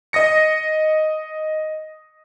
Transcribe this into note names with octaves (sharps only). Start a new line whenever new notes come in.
D#5 D#6 A#6 C#7